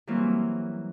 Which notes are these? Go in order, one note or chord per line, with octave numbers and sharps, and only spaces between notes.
E3 F#3 G3 A#3 C4 C#4